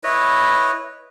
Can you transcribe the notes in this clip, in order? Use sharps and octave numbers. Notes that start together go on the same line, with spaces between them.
E4 B4 C#5 D#5